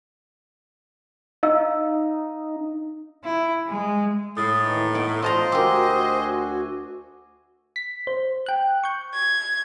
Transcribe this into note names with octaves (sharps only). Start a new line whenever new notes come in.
D#4 D#5 F5 E6
E4
G#3
A2 D#6 A6
D#2 E3 D#4
B3 D#4 D7
D4 F4 C5 D#5 A5 A#5
D2 F#4 G4 A#4 G#5 D6 E6
B6
C5
G5 F#6
C#6 G6
G#6